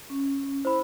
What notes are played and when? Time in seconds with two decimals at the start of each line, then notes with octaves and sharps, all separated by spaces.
0.10 C#4
0.65 E4 C5 B5